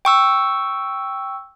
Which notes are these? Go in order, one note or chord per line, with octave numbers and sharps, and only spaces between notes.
G5 C#6 E6